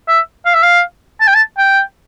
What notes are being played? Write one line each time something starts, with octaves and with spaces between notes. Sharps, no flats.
E5
F5
E5
F5
A5
G5
A5
G5